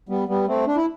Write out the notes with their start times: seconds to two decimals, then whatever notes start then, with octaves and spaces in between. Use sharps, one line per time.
0.09 G3 B3
0.28 G3 B3
0.48 A3 C4
0.67 D4
0.76 E4